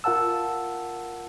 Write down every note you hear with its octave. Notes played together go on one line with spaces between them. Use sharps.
F4 A#4 F#5 A5 E6